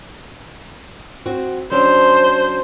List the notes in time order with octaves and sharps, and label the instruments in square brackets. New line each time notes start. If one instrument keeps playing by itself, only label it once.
[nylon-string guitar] C4 F#4
[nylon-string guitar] F#3 C#4 D4 [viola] C5